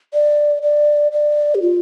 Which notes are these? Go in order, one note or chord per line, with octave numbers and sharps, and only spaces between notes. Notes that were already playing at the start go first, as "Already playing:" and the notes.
D5
D5
D5
G4
F4